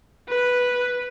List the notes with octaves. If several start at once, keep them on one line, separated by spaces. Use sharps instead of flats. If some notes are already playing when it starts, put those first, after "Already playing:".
B4